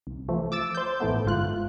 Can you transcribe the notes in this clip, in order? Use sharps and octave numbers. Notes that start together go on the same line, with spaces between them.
C2
E3 F3 A3
D6 E6 A6
C5 G6
A1 A2 A3 B3
G1 G#2 F4 F#6